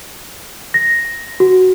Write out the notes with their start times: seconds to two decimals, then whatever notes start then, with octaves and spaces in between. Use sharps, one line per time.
0.74 A#6
1.40 F#4